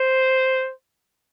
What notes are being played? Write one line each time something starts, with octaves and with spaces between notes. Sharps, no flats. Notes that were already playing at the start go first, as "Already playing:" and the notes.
Already playing: C5